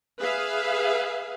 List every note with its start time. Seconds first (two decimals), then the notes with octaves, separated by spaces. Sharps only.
0.19 G#4 B4 E5 F5